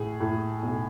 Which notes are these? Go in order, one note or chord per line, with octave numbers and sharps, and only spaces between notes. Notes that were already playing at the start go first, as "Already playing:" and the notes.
Already playing: A2 G#4
A2
B1